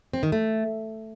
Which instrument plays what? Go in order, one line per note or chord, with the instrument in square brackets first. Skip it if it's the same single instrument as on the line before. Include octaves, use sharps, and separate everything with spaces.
[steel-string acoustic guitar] C4
D#3
A3